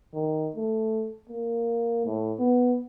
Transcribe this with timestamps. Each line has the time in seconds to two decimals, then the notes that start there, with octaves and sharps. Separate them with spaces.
0.14 D#3
0.56 A3
1.29 A#3
2.05 A2
2.39 B3